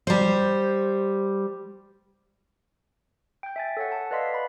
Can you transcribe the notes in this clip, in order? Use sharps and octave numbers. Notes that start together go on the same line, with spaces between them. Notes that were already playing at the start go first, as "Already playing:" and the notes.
G3 C5
G5 G6
E5 G#5 A6
A4 C#5 F#5
A5
B4 D5 D#5 F5 C6 B6
B5